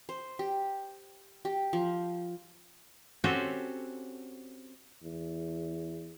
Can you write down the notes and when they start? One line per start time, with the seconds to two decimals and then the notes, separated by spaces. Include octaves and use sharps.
0.09 C5
0.39 G4
1.45 G4
1.73 F3
3.24 C4 C#4 F#4 G4 A4
5.02 E2